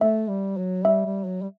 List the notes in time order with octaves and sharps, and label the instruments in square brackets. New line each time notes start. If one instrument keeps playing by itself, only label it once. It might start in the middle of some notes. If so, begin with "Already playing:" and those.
[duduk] A3 [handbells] E5
[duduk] G3
F#3
[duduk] G3 [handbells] E5
[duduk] G3
F#3
G3